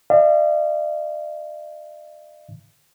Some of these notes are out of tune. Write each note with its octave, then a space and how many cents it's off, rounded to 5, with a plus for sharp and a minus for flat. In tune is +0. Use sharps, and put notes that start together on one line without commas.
D5 +45 F5 -45